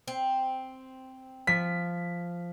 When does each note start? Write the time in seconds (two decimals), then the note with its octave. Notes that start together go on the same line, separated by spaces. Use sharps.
0.07 C4
1.47 F3 B6